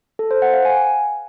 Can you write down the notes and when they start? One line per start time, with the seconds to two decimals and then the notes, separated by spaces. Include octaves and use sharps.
0.19 A4
0.31 C5
0.42 F#5
0.54 F5
0.65 G#5